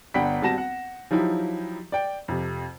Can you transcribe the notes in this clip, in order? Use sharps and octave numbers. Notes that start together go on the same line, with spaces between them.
G1 D4 F#5 G5 B5 B6
G#1 G3 F#4 A5 A#6 E7
F#5
F3 F#3 D#4 E4 G4
D5 G5
F2 C3